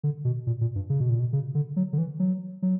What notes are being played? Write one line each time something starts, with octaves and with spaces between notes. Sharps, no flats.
D3
B2
A#2
A#2
G2
C#3
B2
A#2
B2
C#3
D3
F#3
D3
E3
F#3
F#3